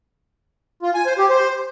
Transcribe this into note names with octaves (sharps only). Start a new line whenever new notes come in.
F4
G#5
C5
G4
C5